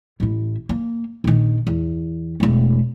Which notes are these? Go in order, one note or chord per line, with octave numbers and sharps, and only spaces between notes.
A1 E4
A#3
A#1 D#3
E2
E1 A3